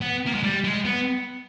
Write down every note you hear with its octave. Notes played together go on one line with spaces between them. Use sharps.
B3
A#3
G#3
G3
G#3
B3